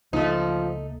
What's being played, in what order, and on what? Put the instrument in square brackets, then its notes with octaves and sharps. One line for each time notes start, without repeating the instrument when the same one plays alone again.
[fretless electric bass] C#2 A#3 [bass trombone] F3 [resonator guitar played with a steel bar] A3 D#4